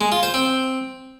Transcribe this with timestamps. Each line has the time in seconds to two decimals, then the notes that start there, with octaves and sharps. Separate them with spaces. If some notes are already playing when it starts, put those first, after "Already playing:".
0.01 G#3
0.12 F4
0.23 C5
0.34 C4